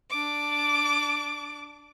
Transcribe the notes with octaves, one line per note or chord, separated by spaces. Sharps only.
D4 D6